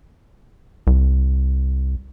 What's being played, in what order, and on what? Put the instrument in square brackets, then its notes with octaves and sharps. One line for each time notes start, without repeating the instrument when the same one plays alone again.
[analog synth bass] C2